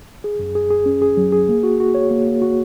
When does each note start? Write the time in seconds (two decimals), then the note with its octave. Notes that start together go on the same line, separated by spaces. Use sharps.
0.24 G#4
0.39 F#2
0.55 G#4
0.70 G#4
0.86 C#4
1.02 G#4
1.17 F#3
1.32 G#4
1.49 A#3
1.63 F#4
1.80 F#4
1.94 C#5
2.11 A#3
2.27 A#3
2.42 F#4